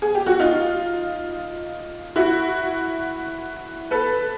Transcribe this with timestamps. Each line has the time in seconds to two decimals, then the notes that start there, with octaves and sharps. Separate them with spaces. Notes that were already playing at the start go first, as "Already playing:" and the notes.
0.02 G#4
0.15 G4
0.26 F#4
0.40 D#4 F4
2.16 E4 F#4
3.91 A4 B4